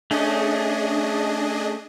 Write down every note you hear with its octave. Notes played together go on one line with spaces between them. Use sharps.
A3 C#4 D4 G#4 D#5